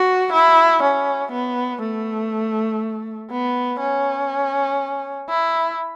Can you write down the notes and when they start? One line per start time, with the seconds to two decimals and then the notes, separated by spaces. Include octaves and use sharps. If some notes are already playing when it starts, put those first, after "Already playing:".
Already playing: F#4
0.33 E4
0.83 C#4
1.32 B3
1.82 A3
3.31 B3
3.80 C#4
5.29 E4